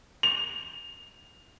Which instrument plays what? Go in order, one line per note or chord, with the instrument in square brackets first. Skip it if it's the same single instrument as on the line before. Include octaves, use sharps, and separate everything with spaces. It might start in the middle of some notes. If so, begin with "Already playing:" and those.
[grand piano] F7